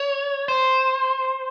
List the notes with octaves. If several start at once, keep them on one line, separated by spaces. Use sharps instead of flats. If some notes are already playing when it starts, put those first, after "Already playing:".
Already playing: C#5
C5